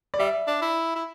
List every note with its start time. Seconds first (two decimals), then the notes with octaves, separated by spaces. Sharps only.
0.14 D5
0.19 G3 E5
0.47 D4
0.62 E4
0.96 E4